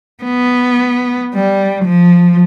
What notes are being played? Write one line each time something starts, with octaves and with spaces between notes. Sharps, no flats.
B3
G3
F3